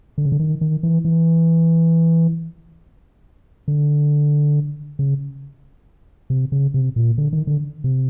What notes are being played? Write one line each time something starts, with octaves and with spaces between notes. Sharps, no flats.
D3
C#3
D3
D#3
D#3
E3
E3
D3
C#3
C3
C#3
C3
A#2
D3
D#3
D3
C3